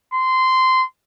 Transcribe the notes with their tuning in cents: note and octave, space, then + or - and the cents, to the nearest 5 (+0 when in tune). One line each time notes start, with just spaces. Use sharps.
C6 -15